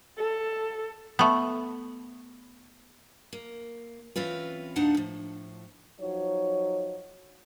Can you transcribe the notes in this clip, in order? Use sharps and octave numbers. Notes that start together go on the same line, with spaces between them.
A4
A3 B3
A#3
E3 C4 C#4 F4 B4
D#2 A#2 D4 D#4 F#5 A5
A2 F3
F3 F#3 D#4 C#5